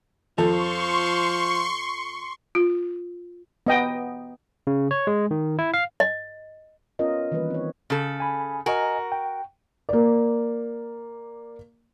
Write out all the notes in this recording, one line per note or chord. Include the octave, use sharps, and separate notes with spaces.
F2 F3 A4 C6 C#6
F4
B3 D#5 G5
C#3
C#5
G#3
D#3
E4
F5
D#5
B3 C#4 F4 A#4 D#5
D#3 E3 G3 A#3 B4
C4 C#5
C#3 A4
G#5 B5
F#4 A#4 D#5 G#5
G5
A#3 D5